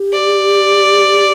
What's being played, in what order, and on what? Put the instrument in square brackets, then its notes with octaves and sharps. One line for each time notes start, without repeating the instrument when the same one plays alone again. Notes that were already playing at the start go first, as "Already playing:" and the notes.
Already playing: [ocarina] G4
[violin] D5